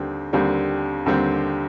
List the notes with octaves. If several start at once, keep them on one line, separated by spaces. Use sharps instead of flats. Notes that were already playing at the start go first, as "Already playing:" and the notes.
Already playing: D#2 D3 G3 C4
D#2 D3 G3 C4
D#2 D3 G3 C4